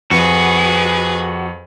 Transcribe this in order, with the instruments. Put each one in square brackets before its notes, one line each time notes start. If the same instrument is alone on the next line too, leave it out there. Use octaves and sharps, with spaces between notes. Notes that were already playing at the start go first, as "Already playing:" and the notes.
[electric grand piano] F2 [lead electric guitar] F#4 [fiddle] G#4 B4